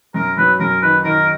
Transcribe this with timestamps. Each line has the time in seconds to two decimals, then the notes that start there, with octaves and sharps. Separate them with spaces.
0.14 F#2 A#4
0.37 F#3 B4
0.60 F#2 A#4
0.82 D#3 B4
1.04 D#3 A#4